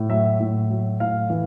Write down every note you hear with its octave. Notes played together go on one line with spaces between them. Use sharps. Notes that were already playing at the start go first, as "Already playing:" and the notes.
Already playing: A2
F#3 E5
A2
F#3
A2 F5
E3